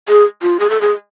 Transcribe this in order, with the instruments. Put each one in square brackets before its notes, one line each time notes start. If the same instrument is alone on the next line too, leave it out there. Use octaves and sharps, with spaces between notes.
[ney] G#4
F4
G#4
A4
G#4